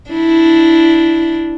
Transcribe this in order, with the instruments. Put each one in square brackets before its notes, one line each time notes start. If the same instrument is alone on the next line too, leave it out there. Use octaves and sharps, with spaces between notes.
[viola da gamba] D4 E4